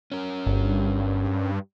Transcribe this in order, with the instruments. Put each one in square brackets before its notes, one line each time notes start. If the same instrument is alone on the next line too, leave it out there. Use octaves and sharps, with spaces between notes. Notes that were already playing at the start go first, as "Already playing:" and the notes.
[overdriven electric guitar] C#4 A#4
[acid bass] G1 [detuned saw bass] G2